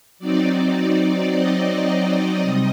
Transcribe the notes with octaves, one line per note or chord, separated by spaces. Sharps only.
F#3 C4 D#4 D5
D#5
C3 G3